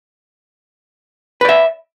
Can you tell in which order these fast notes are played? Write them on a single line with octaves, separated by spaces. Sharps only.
B4 D5 E5